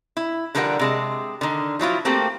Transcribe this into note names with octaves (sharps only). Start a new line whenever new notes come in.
E4
D3 F3 G3 A#4 C5 F#5
C3 G#3 A5
D3 D#3
F3 F#3 E4 F4
A3 A#3 C4 G4